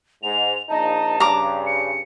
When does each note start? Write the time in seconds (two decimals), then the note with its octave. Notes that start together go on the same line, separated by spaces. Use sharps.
0.23 G#2 F7
0.69 A#1 D#4 A5
1.20 G2 C#3 A#5 D6
1.67 C#7